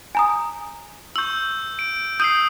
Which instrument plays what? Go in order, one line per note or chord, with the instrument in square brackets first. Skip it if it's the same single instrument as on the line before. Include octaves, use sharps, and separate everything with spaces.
[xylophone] G#5 A#5 D#6
[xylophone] C#6 F#7 [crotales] E6 G6
[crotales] D7
[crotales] D#6 E6 C7 [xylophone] G6 D#7